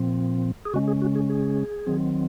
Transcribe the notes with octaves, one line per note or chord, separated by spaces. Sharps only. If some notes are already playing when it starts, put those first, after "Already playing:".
Already playing: A#2 F3 C4
G#4
C#3 G#3 C#4 F#4
G#4
F#4
G#4
G#4
D#3 F#3 C4